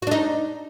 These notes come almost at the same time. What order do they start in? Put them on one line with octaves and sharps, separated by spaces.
F#4 D4 D#4